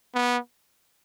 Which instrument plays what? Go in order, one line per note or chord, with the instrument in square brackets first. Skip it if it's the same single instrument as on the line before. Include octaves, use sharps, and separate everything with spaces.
[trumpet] B3